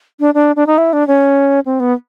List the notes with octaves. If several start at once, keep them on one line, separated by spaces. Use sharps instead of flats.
D4
D4
D4
D#4
E4
D4
C#4
C4
B3